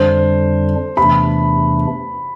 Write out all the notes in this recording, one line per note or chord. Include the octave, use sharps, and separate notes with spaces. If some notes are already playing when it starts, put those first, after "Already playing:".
Already playing: F2 D3 G3 D4 C5
E2 C3 E3 A3 D4 B5